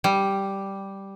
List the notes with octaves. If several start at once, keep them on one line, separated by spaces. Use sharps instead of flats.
G3